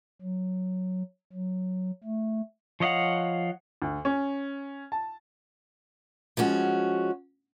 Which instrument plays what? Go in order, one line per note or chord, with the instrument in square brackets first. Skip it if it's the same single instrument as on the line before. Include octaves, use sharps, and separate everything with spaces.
[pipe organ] F#3
F#3
A3
[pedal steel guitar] F3 C#5 D#5 F5 F#5
[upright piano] D2
C#4
A5
[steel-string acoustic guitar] F3 G#3 C#4 F#4